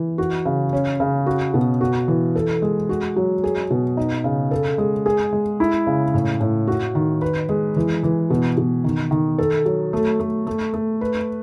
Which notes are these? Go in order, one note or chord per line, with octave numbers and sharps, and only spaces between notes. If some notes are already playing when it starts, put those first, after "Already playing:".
Already playing: E3
F#4
C#3
C#4
C#3
F#4
B2
F#4
E3
A4
G#3
F#4
F#3
G#4
B2
D#4
C#3
A4
G#3
G#4
G#3
E4
C#3
A2
A2
F#4
D#3
B4
G#3
E3
E3
B2
B2
D#3
D#3
A4
F#3
A3
A3
A3
A3
B4